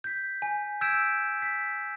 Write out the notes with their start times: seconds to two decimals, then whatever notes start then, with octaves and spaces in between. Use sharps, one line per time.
0.04 G6 B6
0.42 G#5
0.81 E6 G6 G#6 B6 D7 E7
1.42 B6